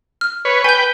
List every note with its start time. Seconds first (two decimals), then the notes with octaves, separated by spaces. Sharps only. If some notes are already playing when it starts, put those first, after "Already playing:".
0.21 F6
0.45 B4 C#5
0.64 B4 G5 G#5 G6